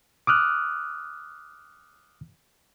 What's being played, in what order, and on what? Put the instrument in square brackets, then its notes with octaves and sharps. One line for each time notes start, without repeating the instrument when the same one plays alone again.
[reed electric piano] D6 D#6 F6 F#6